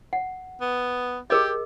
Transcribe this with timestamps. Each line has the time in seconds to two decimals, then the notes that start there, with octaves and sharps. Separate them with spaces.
0.13 F#5
0.61 B3
1.30 G4 G#4 A#4 D#5